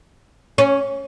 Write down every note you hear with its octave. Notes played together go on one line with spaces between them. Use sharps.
C#4